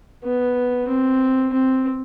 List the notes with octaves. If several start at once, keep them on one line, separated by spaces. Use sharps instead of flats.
B3
C4
C4